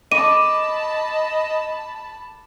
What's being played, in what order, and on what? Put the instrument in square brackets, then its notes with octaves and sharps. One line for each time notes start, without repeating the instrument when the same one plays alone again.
[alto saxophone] D#5 [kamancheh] A5 B5 [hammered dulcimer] D6 [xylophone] D#7